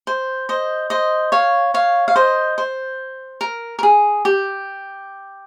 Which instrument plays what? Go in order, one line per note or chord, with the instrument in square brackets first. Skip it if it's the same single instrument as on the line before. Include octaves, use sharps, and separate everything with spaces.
[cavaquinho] C5
C5 D#5
C5 D#5
C#5 F5
C#5 F5
F5
C5 D#5
C5
A#4
A#4
G#4
G4